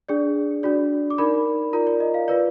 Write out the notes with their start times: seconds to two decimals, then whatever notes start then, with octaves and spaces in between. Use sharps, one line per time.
0.09 D4 G#4 D5
0.63 D4 F#4 D5
1.10 D6
1.18 D#4 A#4 D5 B5
1.73 F4 A#4 D5 A#5
1.87 D5
2.00 D#5
2.14 F5
2.28 F4 B4 D5